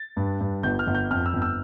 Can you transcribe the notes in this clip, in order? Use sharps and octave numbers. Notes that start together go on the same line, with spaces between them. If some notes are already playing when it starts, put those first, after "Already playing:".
Already playing: A6
G2
G2
G1 G6
F6
G1
G6
F2 F6
E6
G1
E6